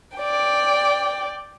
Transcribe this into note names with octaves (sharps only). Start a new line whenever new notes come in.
D5 G5